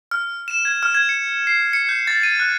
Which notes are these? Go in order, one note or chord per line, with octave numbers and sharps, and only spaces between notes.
F6
E7
G#6
F6
G#6
C#7
C7
C#7
G6
A6
D#7
F#6